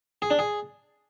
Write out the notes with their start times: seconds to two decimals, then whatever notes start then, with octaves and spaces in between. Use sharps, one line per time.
0.22 G#4
0.30 D4
0.39 G#4